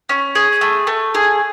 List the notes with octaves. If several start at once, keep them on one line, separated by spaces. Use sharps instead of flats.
C#4
G#4
A3
A3
G#4